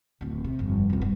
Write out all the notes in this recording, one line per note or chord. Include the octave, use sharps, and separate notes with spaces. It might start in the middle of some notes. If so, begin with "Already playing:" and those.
D1 D3
C3
G1 F2
E1 C#2
G2